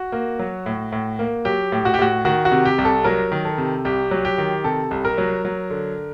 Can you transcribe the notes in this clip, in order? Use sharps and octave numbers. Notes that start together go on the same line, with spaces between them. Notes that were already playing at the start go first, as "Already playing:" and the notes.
Already playing: F#4
A#3
F#3
A2
A2
A#3
F#3 G4
A2
F#4
G4
A2 F#4
D#3 F#4
F#4
C3
G4
C2
A4
F#3 A#4
D#3
A4
C3
C2 G4
F#3
G4
D#3
C3 A4
C2
A#4
F#3
F#3
D3